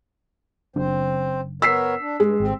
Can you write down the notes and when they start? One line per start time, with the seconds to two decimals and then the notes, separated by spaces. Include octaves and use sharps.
0.76 F#1 F#2 C4 D4 C5
1.62 B3 A#4 C#5 E6 B6 C7
2.00 D4
2.20 G2 G#3
2.40 G#1 C4